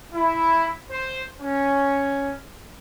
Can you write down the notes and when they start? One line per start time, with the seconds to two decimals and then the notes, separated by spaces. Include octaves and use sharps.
0.14 E4
0.91 C5
1.41 C#4